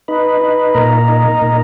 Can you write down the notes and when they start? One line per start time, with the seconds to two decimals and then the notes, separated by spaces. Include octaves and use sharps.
0.08 D#4 B4
0.41 D#4
0.75 A#2 A#4
1.08 D#4
1.42 A#2